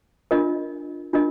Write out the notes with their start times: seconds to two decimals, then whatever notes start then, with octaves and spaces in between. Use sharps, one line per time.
0.31 D4 F4 A#4 D#5
1.13 D4 F4 A#4 D#5